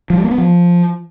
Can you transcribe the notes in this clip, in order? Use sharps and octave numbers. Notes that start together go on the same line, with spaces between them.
F3
G3
A#3
B3
F3